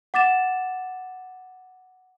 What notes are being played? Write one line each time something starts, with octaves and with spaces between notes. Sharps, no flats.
F#5 D6 A6 E7